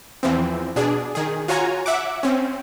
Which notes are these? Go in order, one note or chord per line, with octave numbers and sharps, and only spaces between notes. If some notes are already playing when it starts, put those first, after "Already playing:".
E2 E3 F3 C4
B2 D4 G#4
D#3 G#4
F4 F#4 C#5 G#5 A#5
E5 F#5 D6
C4 C#4